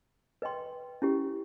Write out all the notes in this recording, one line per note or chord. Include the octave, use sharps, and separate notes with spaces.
B4 D#5 G5 C6
C#4 E4 G4